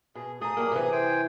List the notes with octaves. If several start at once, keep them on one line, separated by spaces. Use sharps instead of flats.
B2 G#4
A3 G#4 A#5 D#6
F#3 G3 A#3
C3 E3
C5 G5 G#5